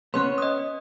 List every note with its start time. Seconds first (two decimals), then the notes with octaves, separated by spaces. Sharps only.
0.14 B3 C#4 C6 F#6
0.38 D#5 D#6